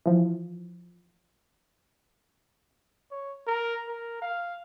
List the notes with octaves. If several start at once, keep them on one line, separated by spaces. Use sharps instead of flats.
E3 F3
C#5
A#4
A#4
F5